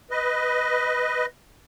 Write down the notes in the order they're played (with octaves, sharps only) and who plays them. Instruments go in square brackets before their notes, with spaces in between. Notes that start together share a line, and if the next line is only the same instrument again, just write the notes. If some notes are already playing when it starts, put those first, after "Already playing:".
[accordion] B4 D#5